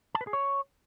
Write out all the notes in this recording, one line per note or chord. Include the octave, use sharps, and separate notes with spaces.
A5
B4
G#4
C#5